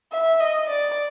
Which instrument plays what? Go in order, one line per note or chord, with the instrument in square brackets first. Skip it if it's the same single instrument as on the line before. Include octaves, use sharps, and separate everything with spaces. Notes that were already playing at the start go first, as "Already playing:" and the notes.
[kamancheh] E5
D#5
D5